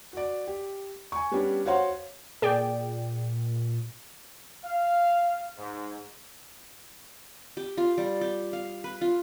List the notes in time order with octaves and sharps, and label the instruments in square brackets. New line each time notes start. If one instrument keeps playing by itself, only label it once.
[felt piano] F#4 D5
G4
G#5 C#6
G3 B3 C#4 D4 G4
F#4 C5 C#5 F5 F#5 C6
[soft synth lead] A#2 [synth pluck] G#4 D5 G5
[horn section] F5
G#2
[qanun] G4
F4
G3
G4
F5
B4
F4